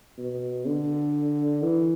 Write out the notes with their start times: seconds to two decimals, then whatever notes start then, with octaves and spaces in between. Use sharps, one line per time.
0.18 B2
0.66 D3
1.63 E3